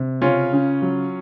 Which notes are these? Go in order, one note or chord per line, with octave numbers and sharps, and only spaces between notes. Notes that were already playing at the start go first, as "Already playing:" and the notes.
Already playing: C3
C#3 C#4 F4
C#3
F#3